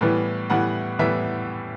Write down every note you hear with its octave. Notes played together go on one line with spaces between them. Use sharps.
A2 E3 G3 B3
A2 E3 G3 B3 F#5
A2 E3 G3 B3 E5